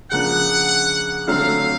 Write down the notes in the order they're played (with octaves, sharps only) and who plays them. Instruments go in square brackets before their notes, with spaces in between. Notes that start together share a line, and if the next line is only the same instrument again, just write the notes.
[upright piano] C#3 F3 A#3 D4 [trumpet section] F#5
[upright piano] D3 F#3 A3 C4 [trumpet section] F5